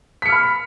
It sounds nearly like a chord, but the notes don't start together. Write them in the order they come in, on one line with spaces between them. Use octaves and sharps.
B6 C#7 F6 B5